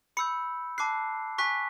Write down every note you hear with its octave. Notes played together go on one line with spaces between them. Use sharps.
B5 E6 G6 C#7
A5 D6 F#6 C7
G#5 C#6 F#6 B6